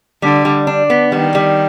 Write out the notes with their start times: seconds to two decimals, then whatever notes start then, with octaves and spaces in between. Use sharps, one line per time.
0.22 D3 G3
0.45 G3
0.67 D4
0.90 B3
1.12 D#3 G3
1.35 G3